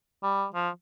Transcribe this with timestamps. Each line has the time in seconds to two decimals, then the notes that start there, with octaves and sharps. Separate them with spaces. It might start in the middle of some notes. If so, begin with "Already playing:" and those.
0.23 G3
0.54 F3